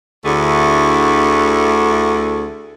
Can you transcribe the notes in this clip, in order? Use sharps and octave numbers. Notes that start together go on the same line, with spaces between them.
D2 D3 A3 E4 G#4